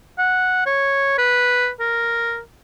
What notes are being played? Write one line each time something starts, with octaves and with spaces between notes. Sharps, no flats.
F#5
C#5
B4
A#4